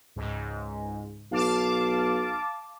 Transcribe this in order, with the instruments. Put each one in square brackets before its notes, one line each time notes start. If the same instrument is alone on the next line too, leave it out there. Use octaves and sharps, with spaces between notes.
[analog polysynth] C#2 G#2
[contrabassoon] B1 [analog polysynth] F5 A5 D6